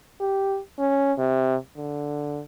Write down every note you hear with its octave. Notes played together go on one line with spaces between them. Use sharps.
G4
C#4
C3
D3